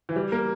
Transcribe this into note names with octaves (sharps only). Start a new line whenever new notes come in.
E3
G3
A#3